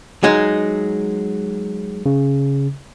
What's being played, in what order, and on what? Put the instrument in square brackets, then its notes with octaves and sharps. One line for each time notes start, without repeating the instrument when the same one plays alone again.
[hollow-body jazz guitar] F#3 G#3 D#4
[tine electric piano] C#3